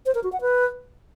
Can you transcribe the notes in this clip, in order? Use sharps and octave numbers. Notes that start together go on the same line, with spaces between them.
C5
A#4
F#4
F#5
B4